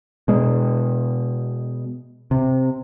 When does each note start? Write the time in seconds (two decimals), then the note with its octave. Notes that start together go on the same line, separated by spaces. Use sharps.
0.28 B2 G#3
2.31 C3